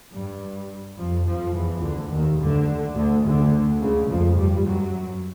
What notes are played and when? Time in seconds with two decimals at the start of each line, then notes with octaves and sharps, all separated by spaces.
0.12 G2 G3
0.97 F2 F3
1.26 F2 F3
1.54 E2 E3
1.82 D2 D3
2.11 D#2 D#3
2.39 D2 D3
2.95 D2 D3
3.24 D2 D3
3.80 C#2 C#3
4.09 F2 F3
4.37 G2 G3
4.65 F#2 F#3